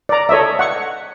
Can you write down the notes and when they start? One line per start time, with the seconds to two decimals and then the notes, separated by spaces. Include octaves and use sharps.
0.09 D5 A#5
0.29 A4 C#5 D#5 E5
0.59 F#5 C#6